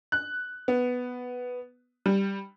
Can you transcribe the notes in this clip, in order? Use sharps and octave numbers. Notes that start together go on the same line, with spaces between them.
F#6
B3
G3